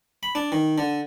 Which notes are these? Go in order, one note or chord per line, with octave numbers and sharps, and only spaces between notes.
B5
D4
D#3
D3